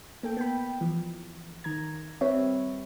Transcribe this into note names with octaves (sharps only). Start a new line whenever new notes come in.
A#3 A4 G5
B3 G5 B5
E3 F3
D#3 A#5 G#6
G3 C4 B4 C#5 E5